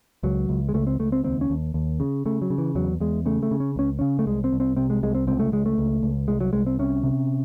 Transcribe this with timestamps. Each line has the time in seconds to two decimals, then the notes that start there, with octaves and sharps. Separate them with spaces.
0.23 C#2 F#3
0.49 C#2
0.69 G#3
0.74 C#2 A3
0.87 C4
0.99 C#2 A3
1.12 C4
1.24 D#2 C4
1.41 C#4
1.50 D#2
1.74 D#2
2.00 C#3
2.26 C#3 A3
2.42 F#3
2.50 C#3
2.58 E3
2.75 E2 F#3
3.00 E2 G#3
3.26 C#3 A3
3.43 A3
3.51 C#3
3.60 C#4
3.76 C#2 C#4
3.99 C#3 C#4
4.19 A3
4.26 C2 G#3
4.44 C4
4.52 C2
4.60 C4
4.77 C3 C4
4.90 G#3
5.03 C2 G#3
5.15 C4
5.27 C#2 C4
5.39 A3
5.52 C#2 G#3
5.66 A3
5.78 C#2
6.03 C#2
6.28 C2 G#3
6.41 F#3
6.53 C2 G#3
6.66 C4
6.79 C3 C#4
7.04 C3